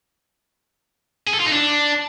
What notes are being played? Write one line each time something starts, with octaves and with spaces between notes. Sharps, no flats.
G#4
A4
F4
D#4
D4